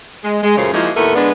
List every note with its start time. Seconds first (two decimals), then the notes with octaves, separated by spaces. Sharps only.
0.24 G#3
0.44 G#3
0.57 F#2 A#2 C#3 A3 C#4 C5
0.73 F3 G#3 A#3 D#4 E4 F#4
0.96 D#2 A2 A3 B3 A#4 E5
1.16 D3 G#3 B3 D4